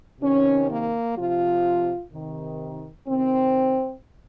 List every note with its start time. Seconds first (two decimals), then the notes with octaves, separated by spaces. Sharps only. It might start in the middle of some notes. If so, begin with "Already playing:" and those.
0.21 C3 D#3 C#4
0.69 A#3
1.16 C3 F3 F4
2.12 C3 D#3
3.08 C3 D#3 C4